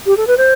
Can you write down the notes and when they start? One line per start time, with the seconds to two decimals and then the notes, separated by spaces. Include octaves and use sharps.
0.06 G4
0.17 A4
0.27 B4
0.37 C5